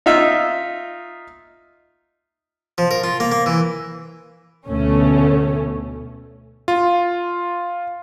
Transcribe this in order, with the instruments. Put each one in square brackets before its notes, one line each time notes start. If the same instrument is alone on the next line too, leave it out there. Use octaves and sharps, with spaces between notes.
[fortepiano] D#4 F4 E5
[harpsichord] F3
A#4
F4
A#3
A#3
E3
[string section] D2 B2 A3 C#4
[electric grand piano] F4